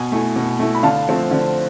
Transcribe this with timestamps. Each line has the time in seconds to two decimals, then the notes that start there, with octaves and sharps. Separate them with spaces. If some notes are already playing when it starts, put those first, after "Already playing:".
Already playing: B2 G#5
0.12 A3 E4
0.36 B2
0.59 A3 E4
0.75 B5
0.83 D3 F5 A5
1.08 F3 A3 C4
1.31 D3